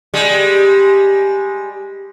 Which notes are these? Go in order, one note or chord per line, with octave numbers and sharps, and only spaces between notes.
G3 G#3